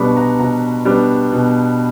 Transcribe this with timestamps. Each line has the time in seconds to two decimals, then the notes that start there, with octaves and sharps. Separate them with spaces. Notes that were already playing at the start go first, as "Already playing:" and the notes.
Already playing: B2 G3 B3 D4 B5 C#6
0.17 A#5
0.39 B2 A#5
0.85 G3 B3 D4
1.32 B2